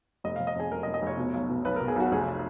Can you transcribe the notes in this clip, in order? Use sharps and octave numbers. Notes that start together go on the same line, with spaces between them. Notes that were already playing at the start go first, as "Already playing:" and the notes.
F1 D#5
F1 F5
D#5
F2 G#4
F1 A#4
D#5
F1
D#5
F1 C#5
B2
B1
B2
B1 B4
B2 A#4
G#4
B1 F#4
F1 G#4